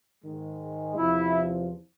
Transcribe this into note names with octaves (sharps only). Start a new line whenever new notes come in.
G#2 D#3 G#3
E2 C3 F3 E4